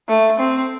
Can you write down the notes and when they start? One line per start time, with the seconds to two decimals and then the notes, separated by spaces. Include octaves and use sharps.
0.09 A3
0.39 C4